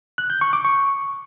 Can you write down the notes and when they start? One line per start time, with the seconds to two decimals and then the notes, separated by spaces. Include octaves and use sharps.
0.18 F#6
0.30 G6
0.41 C#6
0.53 D6
0.65 C#6